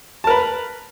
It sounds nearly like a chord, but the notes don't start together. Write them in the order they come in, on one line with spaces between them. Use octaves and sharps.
A5 A#4 B4